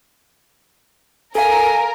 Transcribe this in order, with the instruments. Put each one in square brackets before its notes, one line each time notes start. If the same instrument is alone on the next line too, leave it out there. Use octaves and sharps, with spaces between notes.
[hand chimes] A4 F5 [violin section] A#4 [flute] G#5